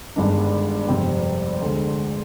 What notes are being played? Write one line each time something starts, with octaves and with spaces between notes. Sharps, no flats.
G1 G2 D#3 G#3 D4
G1 F2 C3 G3 C4
D2 D3 G#3